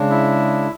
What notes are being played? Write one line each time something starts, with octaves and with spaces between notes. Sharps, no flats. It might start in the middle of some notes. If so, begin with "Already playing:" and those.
Already playing: C#3 G#3 D4
E4